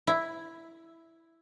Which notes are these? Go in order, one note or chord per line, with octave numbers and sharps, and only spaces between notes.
E4